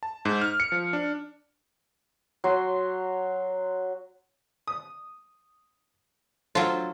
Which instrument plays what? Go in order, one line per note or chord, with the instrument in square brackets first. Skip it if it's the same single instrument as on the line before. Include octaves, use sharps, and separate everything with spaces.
[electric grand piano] A5
G#2
F6
C#7
F3
D4
[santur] F#3 C6
[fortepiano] D#6
[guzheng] F#3 F4 [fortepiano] A4 C5